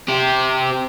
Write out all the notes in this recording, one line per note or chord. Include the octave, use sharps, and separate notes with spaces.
C4 G4